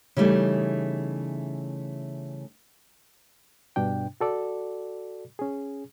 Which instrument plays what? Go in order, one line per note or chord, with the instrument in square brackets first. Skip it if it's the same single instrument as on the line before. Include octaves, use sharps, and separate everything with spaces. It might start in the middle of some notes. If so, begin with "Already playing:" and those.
[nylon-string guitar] C#3 E3 G3 A3 D#4
[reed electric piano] G2 B2 D4 G5
F#4 A4 D5
C#4 G#4